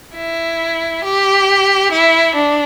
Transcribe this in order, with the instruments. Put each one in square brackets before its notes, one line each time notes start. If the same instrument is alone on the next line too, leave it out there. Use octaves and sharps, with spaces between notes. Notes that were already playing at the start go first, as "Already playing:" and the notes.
[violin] E4
G4
E4
D4